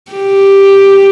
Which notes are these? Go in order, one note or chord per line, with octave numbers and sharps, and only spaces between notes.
G4